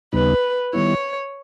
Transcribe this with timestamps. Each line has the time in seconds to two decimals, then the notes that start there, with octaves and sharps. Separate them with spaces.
0.13 D#2 C#3 G3 B3 D#4 B4
0.73 D#3 G3 B3 E4 C#5